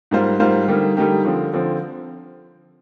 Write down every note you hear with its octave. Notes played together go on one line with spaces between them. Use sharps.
G#2 G3 A#3 F4 C5
G#2 G3 A#3 F4 C5
D3 G3 A#3 D#4 G4
D3 G3 A#3 D#4 G4
D3 F3 C4
D3 F3 C4